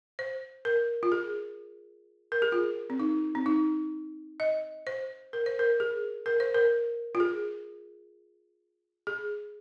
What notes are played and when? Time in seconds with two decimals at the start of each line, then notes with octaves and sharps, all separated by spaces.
0.19 C5
0.65 A#4
1.03 F4
1.12 G#4
2.32 A#4
2.42 G#4
2.52 F4
2.90 C4
2.99 D#4
3.35 C4
3.46 D#4
4.40 D#5
4.87 C5
5.33 A#4
5.46 C5
5.59 A#4
5.80 G#4
6.26 A#4
6.40 C5
6.55 A#4
7.15 F4
7.20 G#4
9.07 G#4